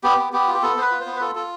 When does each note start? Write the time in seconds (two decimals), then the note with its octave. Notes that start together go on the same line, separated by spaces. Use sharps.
0.03 B3 G4
0.18 B3
0.33 B3 G4
0.48 F4
0.54 G4
0.63 B3 A4
0.76 B3 C5
0.82 B4
0.91 F4
1.01 C5
1.06 B3
1.16 B4
1.21 F4 A4
1.35 F4 A4